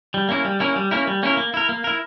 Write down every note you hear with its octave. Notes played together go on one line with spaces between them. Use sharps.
G3
A#3 C#4 E4 A#4
G3
A#3 C#4 E4 A#4
G3
A#3 C#4 E4 A#4
G3
A#3 C#4 E4 A#4
A#3
E4 A#4
A#3
E4 A#4